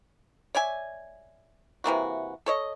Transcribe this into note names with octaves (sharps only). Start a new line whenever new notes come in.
C#5 D5 E5 G#5
C3 E3 A#3 F#4
A4 C#5 D#5